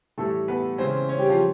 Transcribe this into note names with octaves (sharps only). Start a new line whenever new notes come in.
A2 E3 G3 A3 A4
B3 B4
C#3 E3 G#3 C4 C#4 C5
C#4 C#5
G3 G4
F3 F4